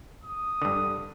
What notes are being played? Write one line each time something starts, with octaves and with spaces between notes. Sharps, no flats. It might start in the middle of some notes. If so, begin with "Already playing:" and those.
D#6
G2 D3